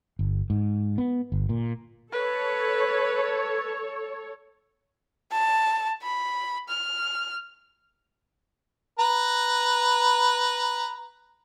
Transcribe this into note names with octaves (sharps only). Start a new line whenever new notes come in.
G1
G#2
B3
G1
A#2
A4 B4 C#5
A5
B5
F6
B4 A#5